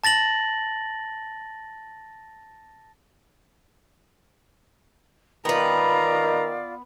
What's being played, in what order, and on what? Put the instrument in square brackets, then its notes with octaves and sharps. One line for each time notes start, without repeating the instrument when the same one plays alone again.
[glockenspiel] A5 A6 A#6 F#7
[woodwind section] D#3 [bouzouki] B3 B4 [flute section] F4 D5 [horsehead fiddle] A#5